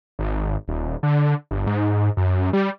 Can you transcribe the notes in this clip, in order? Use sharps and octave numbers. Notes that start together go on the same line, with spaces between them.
G#1
D#1
D3
G1
G#2
F#2
G3